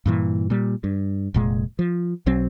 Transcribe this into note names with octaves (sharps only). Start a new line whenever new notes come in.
G2 A#2 E3
A#2 G3
G2
F1 A#2 G#3
F3
B1 F#3 C4